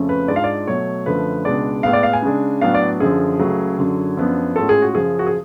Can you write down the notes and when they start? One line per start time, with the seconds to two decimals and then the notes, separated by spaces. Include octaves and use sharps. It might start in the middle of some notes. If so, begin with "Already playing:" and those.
Already playing: F2 C#3 F3 A3 C#4
0.09 B4
0.28 G#2 G#3 D4 F4 D5
0.36 F5
0.44 D5
0.67 B2 F#3 A3 C#5
1.06 F#2 D3 F3 A3 B4
1.45 C#2 B2 G#3 D4 D5
1.83 A2 G#3 B3 F5
1.93 D5
2.03 F5
2.13 G#5
2.23 C#3 G#3 D4
2.61 A2 F#3 B3 D4 F5
2.74 D5
3.00 F#2 D3 F3 G#4
3.39 C#2 C#3 F#3 A3
3.78 F#2 D3 F#3
4.17 F#2 F3 B3 D4
4.56 A2 G#3 C#4 F4 A4
4.69 G#4
4.82 F#4
4.95 F#2 C#3 F3 G#4
5.19 F#4
5.26 G#4